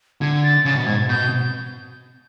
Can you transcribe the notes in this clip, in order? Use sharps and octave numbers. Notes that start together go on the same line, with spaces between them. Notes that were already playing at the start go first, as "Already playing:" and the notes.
D3 G#6
A6
C#3 A6
B2
G#2 G#6
B2 G6